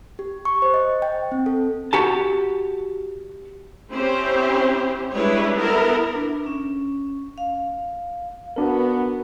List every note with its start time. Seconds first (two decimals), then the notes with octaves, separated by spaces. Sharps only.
0.19 G4
0.45 C#6
0.62 C5
0.74 D#5
1.02 G5
1.32 C4
1.46 A4
1.93 F#4 G4 A5
3.91 C4 C#4 E4 G4 C5
5.12 G3 G#3 D4 E4 B4 C#5
5.56 B3 E4 A4 A#4
6.13 D4
6.46 C#4
7.38 F5
8.56 B3 D4 F#4 A#4